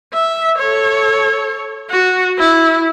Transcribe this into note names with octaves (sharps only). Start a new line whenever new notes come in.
E5
A4 C#5
F#4
E4